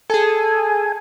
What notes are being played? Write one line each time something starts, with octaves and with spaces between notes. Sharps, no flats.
G#4 A4 G#5